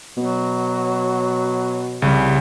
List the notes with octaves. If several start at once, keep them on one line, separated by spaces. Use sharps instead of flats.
B2 F#3
C2 C#3 G3